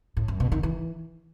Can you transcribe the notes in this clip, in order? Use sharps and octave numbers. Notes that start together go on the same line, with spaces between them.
A2
F#2
B2
D#3
E3